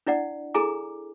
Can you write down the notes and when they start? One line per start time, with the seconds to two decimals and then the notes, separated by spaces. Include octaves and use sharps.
0.07 D4 E4 D5 F#5
0.54 E4 G#4 A4 G#5 A#5 D6